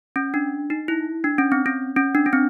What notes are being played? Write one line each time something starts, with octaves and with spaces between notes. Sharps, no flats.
C#4
D4
D#4
E4
D4
C#4
C4
C#4
C#4
D4
C#4
C4